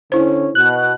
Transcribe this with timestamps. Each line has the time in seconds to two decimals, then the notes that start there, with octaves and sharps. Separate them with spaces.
0.12 D3 C#4 E4 C5
0.55 B2 F#6